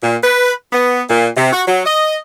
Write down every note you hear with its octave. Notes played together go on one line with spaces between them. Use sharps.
A#2
B4
B3
A#2
C3
F#4
F#3
D#5